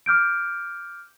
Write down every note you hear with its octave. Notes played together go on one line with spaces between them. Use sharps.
D6 F6 G6 D7